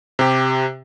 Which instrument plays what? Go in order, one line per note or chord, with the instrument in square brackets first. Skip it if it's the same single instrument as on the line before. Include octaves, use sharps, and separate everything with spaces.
[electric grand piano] C3 G4